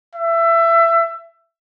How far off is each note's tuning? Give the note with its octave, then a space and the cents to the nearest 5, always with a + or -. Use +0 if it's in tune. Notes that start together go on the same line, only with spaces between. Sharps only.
E5 +20